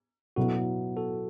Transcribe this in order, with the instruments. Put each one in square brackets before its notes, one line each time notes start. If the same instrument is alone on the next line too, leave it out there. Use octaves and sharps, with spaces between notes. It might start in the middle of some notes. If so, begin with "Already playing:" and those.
[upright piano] B2 F#3 B3 E4 [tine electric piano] F#4 A4
[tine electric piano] F#4 A4